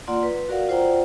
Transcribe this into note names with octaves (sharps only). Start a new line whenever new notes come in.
A#3 F4 D5 F#5 C6
B4
F#4 A#4 D5 F5 F#5
F4 C5 D5 F#5 G5 A#5